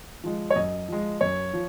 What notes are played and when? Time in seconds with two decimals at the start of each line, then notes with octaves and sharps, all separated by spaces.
0.24 F3 G#3
0.50 C#5
0.56 F#2 D#5
0.88 F3 G#3
1.21 F#2 C#5
1.53 F3